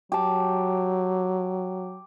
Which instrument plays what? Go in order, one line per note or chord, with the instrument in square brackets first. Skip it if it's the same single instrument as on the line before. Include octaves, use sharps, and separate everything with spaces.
[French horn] F#3 [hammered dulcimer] G4 A5